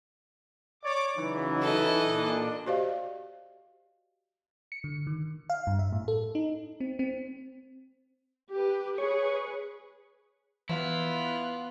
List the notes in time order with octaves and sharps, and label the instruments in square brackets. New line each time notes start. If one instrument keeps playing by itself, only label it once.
[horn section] C#5 D5 [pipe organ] D6
[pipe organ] C#3 F#3 [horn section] E3 [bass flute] D#4
[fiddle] A4 D#5
[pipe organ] A#2 D4
[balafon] F#4 G4 C5 D5 D#5 F5
[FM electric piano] C#7
D3
D#3
F5
G2
E5
A2
A4
D#4
C4
C4
[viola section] G4 B4
[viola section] G#4 B4 [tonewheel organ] C#5
[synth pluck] E3 [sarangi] B3 [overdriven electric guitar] E4 [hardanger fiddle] F4